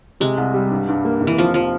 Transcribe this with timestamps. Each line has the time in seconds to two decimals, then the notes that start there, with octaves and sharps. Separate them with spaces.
0.20 C3 G#3
0.38 C2
0.54 G3
0.70 G2
0.88 G2
1.05 A#3
1.21 F1
1.27 E3
1.38 F1 F3
1.54 F3